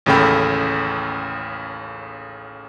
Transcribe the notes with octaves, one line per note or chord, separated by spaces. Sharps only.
A1 D#2 C#3 A4 G5 B5